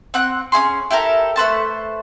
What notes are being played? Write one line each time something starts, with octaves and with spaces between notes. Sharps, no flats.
C4 F#5 F#6
C#4 E4 G#4 C6
E4 G4 A4 A#4
A3 B4 C5 A5